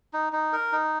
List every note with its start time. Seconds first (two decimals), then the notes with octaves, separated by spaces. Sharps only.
0.13 D#4
0.33 D#4
0.53 A#4
0.72 D#4